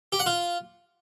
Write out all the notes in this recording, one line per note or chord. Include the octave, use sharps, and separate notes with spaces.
G4
F#5
F4